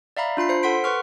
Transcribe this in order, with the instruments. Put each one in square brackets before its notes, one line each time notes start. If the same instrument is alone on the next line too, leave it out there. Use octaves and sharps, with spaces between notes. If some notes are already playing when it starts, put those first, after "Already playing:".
[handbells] D5 E5 F5 A#5 B5
D4 F4 B5 C7
C5 C7
A4 F#5 C6 B6 D7
B4 C6 C#6 F6